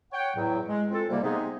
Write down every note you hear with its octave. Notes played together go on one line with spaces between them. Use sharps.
C#5 F#5 G5
E2 A2 F#3
G#3
C4 F4 A4
C2 G#2 C3 G3 A#3
C3 G#3 B3 D#4 G#4